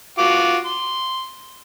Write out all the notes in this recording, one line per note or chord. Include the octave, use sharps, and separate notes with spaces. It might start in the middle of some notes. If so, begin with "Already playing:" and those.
F4 F#4 D6
C6